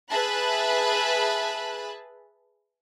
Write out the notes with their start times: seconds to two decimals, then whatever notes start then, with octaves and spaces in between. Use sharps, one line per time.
0.11 G#4 B4 E5 A5 B5 F#6